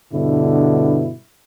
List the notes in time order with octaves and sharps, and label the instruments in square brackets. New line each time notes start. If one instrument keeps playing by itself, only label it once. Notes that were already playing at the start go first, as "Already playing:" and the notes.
[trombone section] G2 B2 D3 E4